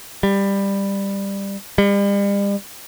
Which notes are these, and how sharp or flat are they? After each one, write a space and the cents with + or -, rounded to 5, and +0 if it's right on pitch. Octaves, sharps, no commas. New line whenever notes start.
G3 +15
G3 +40